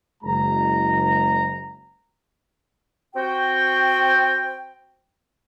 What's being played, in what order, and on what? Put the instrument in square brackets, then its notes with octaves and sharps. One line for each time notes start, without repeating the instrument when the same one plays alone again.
[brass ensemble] F#1 G#3 A#5
[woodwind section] C4 F#4 G5